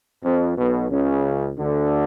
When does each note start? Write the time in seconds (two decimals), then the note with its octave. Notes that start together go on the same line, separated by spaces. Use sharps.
0.24 F2
0.57 B1 B2
0.90 C#2 C#3
1.59 D2 D3